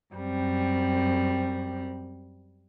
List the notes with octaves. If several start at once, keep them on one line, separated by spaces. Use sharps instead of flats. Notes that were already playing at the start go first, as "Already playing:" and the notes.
F#2 G3 C4